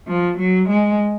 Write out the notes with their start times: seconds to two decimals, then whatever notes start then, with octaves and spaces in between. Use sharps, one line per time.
0.08 F3
0.38 F#3
0.69 G#3